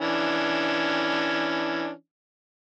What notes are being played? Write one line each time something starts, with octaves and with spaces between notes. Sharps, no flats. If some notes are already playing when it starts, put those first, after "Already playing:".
E3 C#4 D4